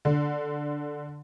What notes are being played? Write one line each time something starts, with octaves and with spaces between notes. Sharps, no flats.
D3